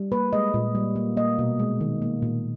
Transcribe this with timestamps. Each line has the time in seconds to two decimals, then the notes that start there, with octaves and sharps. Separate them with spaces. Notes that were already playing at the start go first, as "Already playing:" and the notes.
Already playing: G3
0.12 A#3 B4
0.33 G#3 D#5
0.54 A#2
0.75 G3
0.96 A#3
1.17 A#3 D#5
1.39 B2
1.59 G#3
1.81 D#3
2.02 A#3
2.22 A#2